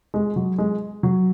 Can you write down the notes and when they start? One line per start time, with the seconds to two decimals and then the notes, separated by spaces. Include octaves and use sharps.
0.14 G#3
0.36 F#3
0.58 G#3
1.03 F#3